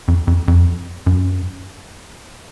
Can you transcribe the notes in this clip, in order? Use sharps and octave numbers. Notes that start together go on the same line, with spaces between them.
F2
F2
F2
F#2